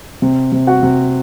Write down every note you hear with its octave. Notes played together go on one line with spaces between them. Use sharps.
C3
C3
F#4 F#5
C3